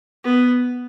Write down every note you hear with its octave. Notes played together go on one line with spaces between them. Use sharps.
B3